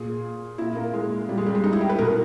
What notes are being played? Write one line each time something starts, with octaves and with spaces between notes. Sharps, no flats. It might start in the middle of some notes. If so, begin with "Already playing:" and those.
Already playing: A#2 G#4
A#2 E4
A#3
G#3
A#2 G3
G#3
G3
G#3
D#4
E4
G4
B4
B2 A#4